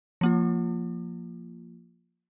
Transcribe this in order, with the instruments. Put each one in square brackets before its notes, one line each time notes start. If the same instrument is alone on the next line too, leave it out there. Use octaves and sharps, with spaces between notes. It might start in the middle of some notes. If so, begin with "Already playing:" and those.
[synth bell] F3 A#3 F4